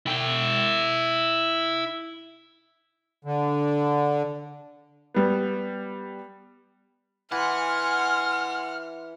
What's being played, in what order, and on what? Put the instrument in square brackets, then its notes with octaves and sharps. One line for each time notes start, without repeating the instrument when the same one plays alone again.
[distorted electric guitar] E4 G5
[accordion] D3
[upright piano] G3 B3
[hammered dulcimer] E3 [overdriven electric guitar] F#5 [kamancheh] G#5 C6 [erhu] F6